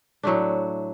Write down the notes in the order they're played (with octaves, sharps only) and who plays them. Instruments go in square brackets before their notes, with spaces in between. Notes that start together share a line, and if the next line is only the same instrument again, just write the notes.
[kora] A2 F#3 A3 D4